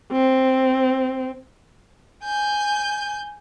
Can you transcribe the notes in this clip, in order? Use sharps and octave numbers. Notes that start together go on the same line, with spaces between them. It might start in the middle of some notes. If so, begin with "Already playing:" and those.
C4
G#5 G6